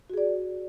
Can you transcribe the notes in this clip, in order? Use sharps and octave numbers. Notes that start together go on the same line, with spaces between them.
F#4 G#4 D5